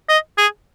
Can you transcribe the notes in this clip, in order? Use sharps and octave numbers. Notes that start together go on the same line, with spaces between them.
D#5
G#4